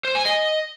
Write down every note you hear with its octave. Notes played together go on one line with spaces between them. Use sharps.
C5
G#5
D#5